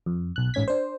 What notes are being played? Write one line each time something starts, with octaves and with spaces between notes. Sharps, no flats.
F2
B1 F#6
A1 G#2 C#4 G#6 B6
D4 C5